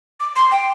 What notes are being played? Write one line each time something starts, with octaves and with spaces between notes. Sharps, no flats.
D6
C6
G5